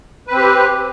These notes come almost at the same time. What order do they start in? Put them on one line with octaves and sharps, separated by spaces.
B4 C4 G4